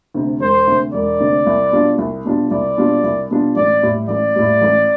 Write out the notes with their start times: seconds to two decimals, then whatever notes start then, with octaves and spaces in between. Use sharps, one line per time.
0.14 D2 C3
0.40 E1 C5
0.67 D2 C3
0.93 E1 D5
1.20 D2 C3
1.46 C2
1.72 B2 G3 D4 F4
1.98 C2
2.25 B2 G3 D4 F4
2.51 C2 D5
2.78 B2 G3 D4 F4
3.04 C2
3.31 B2 G3 D4 F4
3.56 A1 D5
3.83 A2 G3
4.08 A1 D5
4.36 A2 G3
4.62 A1